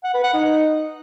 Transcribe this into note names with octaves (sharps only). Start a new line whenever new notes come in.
F#5
B4
F#5
D#4